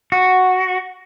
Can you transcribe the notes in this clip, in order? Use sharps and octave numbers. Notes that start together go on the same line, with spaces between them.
F#4